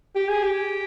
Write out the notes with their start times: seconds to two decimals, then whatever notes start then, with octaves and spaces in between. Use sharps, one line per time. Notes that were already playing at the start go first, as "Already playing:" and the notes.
0.15 G4
0.29 G#4
0.43 G4